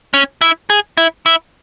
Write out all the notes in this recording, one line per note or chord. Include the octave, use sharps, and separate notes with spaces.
C#4
E4
G#4
E4
E4